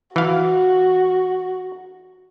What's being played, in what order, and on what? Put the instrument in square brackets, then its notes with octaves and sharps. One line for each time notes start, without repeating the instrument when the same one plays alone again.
[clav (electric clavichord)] E3 F5 [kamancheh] F#4